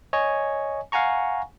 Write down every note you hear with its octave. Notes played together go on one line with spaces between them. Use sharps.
C#5 D#5 G#5
F5 F#5 G#5 A#5 C#6